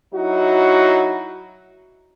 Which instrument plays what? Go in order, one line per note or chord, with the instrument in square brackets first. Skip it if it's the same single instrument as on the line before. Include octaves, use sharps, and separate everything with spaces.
[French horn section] F#3 D#4 E4 F#4